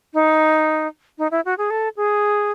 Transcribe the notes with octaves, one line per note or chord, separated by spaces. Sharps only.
D#4
D#4
E4
F#4
G#4
A4
G#4